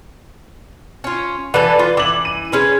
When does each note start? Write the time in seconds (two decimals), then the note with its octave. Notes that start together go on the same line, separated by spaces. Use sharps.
1.04 C#4 F4
1.54 E3 A4 B4 D5
1.79 F4
1.97 E3 D6 F#7
2.25 D#7
2.52 G#3 C#4 B4